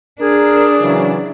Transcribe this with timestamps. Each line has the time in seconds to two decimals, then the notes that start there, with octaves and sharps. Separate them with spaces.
0.21 D4 G#4 A#4
0.80 C#3 E3 F#3